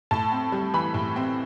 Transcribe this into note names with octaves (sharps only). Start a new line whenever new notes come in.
A2 A5
C4
G3
E3 B5
A2
C4